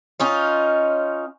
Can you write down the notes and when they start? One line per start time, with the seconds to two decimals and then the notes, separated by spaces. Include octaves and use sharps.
0.20 C#4 D#4 F4